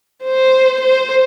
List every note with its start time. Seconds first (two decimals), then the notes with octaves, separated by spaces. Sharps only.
0.23 C5
0.81 C5